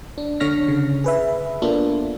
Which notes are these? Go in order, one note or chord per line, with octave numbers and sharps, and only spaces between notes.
D4
D3 D4 C#5 F6 A#6 B6
C#3
G#4 B4 E5
A#3 B3 D4 F4 A4